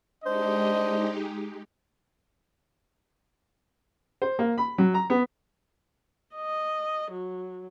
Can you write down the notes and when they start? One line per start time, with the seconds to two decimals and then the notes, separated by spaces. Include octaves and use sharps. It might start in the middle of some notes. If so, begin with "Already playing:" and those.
0.24 G#3 D4 D#4 G4 C5 D#5
4.22 C5
4.39 A#3
4.58 B5
4.78 F#3
4.94 A#5
5.10 B3
6.35 D#5
7.11 F#3